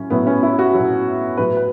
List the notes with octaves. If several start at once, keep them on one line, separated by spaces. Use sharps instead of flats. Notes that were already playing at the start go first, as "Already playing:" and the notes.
Already playing: A2 F#3 C#4
A2 F#3 B3
C#4
E4
F#4
A2 F#3
A2 F#3 B4
B4